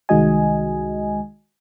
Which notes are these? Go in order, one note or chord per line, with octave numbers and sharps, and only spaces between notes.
C2 D#3 G#3 F#4 D#5 G#5